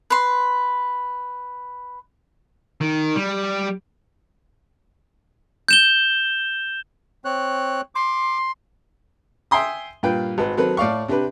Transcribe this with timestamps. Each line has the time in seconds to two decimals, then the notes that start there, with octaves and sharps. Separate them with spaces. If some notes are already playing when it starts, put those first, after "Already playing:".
0.10 B4 C6
2.81 D#3
3.16 G3
5.68 G6 E7 G7
7.25 C4 C#5 F#6
7.95 C6 D6
9.51 E5 G5 G#5 C6 D#6
10.03 G2 A#2 F4 B4 G5
10.38 G#1 B4
10.57 D#3 F#3 C4 A4 B4
10.77 A2 D5 F5 C#6
11.08 C3 D4 G4 B4